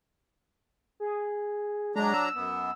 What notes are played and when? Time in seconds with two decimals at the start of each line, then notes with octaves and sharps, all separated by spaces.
1.00 G#4
1.96 F#3 G#3 D4 A#5
2.14 E6
2.35 F#2 B3